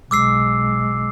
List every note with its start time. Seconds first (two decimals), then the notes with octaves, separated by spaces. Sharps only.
0.11 B1 G#3 D6 E6 C7